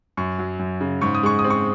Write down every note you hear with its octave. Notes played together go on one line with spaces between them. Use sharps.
F#2 C#6
F#3
F#2
C#3
G#2 C#6
D#6
G#3 C#6
D#6
C4
C#6